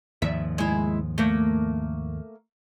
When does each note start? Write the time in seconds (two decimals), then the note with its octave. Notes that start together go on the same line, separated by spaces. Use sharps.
0.22 D#2 G#2 F3 E5
0.58 G#3 E4
1.18 A3 A#3